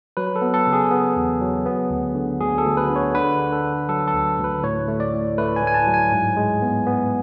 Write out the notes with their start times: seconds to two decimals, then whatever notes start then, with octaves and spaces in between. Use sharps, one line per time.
0.17 F#3 B4
0.36 A4
0.42 B3
0.54 A4
0.67 C#3
0.73 G#4
0.91 B3
1.17 E2
1.41 F#3
1.66 B3
1.91 D2
2.15 D3
2.40 D2 G#4
2.58 A4
2.65 D2
2.77 B4
2.90 D3
2.96 C#5
3.14 D3 B4
3.39 D3
3.52 A4
3.65 D3
3.89 F#3 A4
4.08 A4
4.14 D2
4.39 D2
4.44 B4
4.63 A2 C#5
4.88 A3
5.00 D5
5.14 A2
5.38 A3 B4
5.56 G#5
5.62 A2
5.67 G#5
5.74 A5
5.87 F#3
5.94 G#5
6.12 G#2
6.37 G#3
6.62 B3
6.86 B3